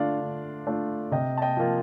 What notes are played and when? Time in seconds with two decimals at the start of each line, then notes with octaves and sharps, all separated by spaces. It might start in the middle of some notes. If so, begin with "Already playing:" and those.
Already playing: D3 A3 D4 F4 D5 F5
0.20 D3
0.67 A3 D4 F4
1.11 C3 D#5 G5
1.38 A5
1.42 D#5 G5
1.57 F3 A#3 F4